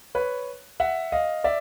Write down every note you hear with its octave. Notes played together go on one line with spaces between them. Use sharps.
B4 C#5
E5 F#5
D#5 F5
D5 E5